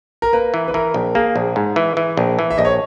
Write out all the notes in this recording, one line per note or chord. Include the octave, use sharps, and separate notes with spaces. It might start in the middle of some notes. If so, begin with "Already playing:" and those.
A#4
A#3 B4
E3
B4
E3 A#4
A#1
A#3 G#4
A#1
G#2
E3
E3
A#1
E3
E5
A#1 D#5
C#5